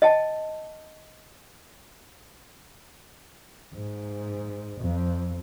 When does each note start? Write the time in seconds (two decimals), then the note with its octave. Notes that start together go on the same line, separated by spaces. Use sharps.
0.02 D#5 G5 A5
3.74 G#2
4.81 F2